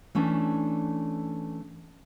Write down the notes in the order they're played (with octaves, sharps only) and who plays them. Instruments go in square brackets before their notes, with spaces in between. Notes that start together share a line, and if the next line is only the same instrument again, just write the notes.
[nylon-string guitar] E3 A3 C#4 D4